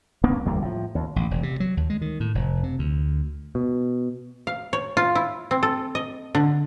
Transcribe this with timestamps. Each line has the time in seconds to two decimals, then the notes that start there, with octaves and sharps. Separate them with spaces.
0.24 A#3 B3 C#4 D4
0.45 G1 E2 G3 A#3
0.62 A2 F3
0.95 D#2
1.16 A1
1.31 E1
1.43 C3
1.60 F#3
1.77 D#2
1.90 G#3
2.01 D#3
2.20 A2
2.35 F1
2.63 C3
2.79 D2
3.55 B2
4.47 F5
4.73 C#5
4.97 F4
5.15 E4
5.51 C4
5.63 A4
5.95 D#5
6.35 D3